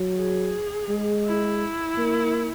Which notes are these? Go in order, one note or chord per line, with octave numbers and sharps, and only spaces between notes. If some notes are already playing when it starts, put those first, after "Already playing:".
Already playing: F#3
G#4
G#3
E4
A#3